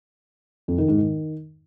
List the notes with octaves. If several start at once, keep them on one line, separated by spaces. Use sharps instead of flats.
F2
D#3
G#2
D#3